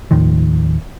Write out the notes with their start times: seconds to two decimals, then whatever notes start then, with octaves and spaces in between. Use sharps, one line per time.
0.11 D#2 A2 D#3 F3